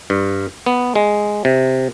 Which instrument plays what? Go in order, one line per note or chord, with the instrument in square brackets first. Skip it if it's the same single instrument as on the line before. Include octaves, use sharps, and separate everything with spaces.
[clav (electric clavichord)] G2
B3
G#3
C3